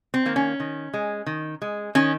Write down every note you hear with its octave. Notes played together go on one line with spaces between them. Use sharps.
C4
D#3 A#3
C#4
D#3
G#3
D#3
G#3
D#3 C#4